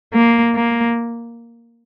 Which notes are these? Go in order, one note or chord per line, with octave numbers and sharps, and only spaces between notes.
A#3
A#3